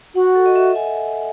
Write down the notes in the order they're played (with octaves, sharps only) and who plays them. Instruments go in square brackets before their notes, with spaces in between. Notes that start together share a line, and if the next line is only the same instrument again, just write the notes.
[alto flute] F#4 [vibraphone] F#5
[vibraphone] A4
D#5
E5
G#5